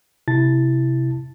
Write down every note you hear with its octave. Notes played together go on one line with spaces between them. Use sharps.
C3 E4 A5 A6